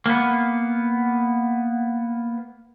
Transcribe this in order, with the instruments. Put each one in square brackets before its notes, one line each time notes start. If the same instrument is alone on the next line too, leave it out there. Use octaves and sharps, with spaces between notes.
[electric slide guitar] A#3 B3